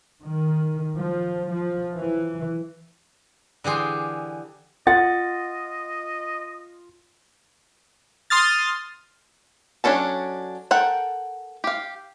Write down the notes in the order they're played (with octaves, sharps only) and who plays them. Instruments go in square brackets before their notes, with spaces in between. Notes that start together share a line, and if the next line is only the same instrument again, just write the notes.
[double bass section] D#3
F3
F3
E3
[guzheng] D3 E3 G4 G#4 C6
[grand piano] F4 A6 [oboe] D#5 [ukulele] F#5
[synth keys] C6 D#6 F6 A6
[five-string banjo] F#3 C#4 D4 A4 A5
A4 A#4 F#5 G5
G4 F5